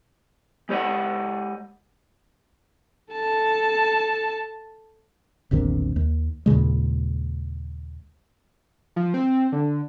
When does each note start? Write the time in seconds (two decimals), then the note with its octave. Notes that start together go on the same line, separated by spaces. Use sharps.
0.69 G#3 G4 C#5 D#5 F#5
3.13 A4 A5
5.51 E1 A#1 C3 D#3
5.96 D#2
6.46 D#2 A#2 C#3 G#3
8.96 F3
9.14 C4
9.52 D3